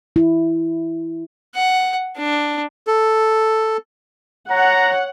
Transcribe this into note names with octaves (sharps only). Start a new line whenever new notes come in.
E4
F#5
D4
A4
C#5 F#5 A#5